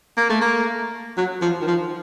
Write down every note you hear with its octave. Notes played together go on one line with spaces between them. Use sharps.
A#3
A3
A#3
F#3
F3
D#3
F3